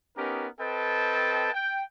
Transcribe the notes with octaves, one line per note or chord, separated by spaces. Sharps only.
B3 C#4 D#4 G4 A#4
C4 A4 B4 D#5 G5 A5
G5